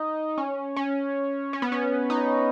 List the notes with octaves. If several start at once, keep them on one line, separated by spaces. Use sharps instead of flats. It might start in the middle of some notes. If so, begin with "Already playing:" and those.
Already playing: D#4
C#4
C#4
C#4
B3
C#4
D#4